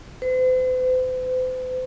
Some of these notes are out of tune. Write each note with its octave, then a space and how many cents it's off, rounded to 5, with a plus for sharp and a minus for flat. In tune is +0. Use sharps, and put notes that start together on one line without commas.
C5 -45